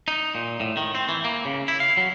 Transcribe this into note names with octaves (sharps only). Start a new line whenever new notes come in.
D#4
A#2
A2
D#3
C4
E3
A#3
C#3
E4
F5
F#3